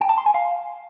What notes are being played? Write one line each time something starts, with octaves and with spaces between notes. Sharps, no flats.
G5
A5
C6
G#5
F5